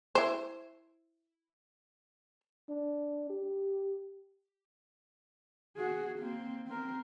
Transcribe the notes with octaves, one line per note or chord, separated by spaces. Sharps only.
E4 C5
D4
G4
F#4 G#4
A#3 C4
C4 A#4